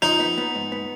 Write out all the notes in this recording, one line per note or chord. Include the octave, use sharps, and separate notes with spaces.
F3 D#4
B3
B3
G#2
B3